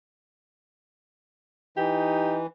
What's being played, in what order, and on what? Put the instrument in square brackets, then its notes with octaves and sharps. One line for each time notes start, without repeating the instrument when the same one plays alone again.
[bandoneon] E3 [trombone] D#4 [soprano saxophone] G4